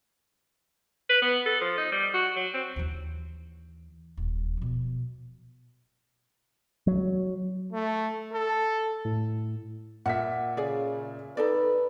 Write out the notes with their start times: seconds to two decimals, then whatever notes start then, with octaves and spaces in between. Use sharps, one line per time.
1.10 B4
1.22 B3
1.46 A4
1.61 F3
1.78 D#4
1.92 G3
2.14 F#4
2.36 F#3
2.54 C4
2.76 D#2 E3
4.17 D#1
4.57 B2 F3
6.87 F#3
7.73 A3
8.33 A4
9.05 A2
10.06 A#2 E5 F#5 B6
10.57 C#3 G#4 D5
11.37 D#4 A4 B4 D5